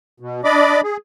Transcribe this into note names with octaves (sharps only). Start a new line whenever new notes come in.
B2
D4 D5 D#5 B5 D6
G#4